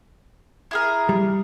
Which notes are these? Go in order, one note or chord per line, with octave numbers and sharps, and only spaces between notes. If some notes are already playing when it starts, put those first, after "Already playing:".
E4 G#4 A#4
G3